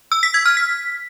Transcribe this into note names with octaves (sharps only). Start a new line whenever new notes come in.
E6
B6
G#6
F6
B6